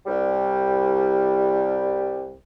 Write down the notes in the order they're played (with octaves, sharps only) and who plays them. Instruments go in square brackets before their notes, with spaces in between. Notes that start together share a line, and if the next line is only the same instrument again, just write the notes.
[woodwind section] C2 G3